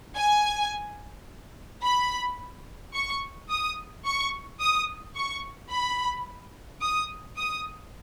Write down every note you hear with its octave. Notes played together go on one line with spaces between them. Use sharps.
G#5
B5
C#6
D#6
C#6
D#6
C#6
B5
D#6
D#6